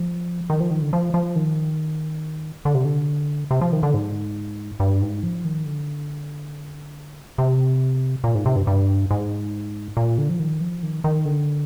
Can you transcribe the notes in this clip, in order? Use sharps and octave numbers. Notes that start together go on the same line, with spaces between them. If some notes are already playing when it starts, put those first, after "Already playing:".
Already playing: F3
D#3
F3
D#3
D3
F3
F3
D#3
D3
C3
D3
C3
F3
D#3
D3
G#2
G2
G#2
F3
D#3
D3
C3
A#2
G#2
C3
G2
G2
G#2
A#2
D3
F3
D#3
F3
D#3
D#3
D3